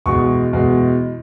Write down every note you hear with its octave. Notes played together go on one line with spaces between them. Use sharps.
E2 B2 G#3 C#6
E2 B2 G#3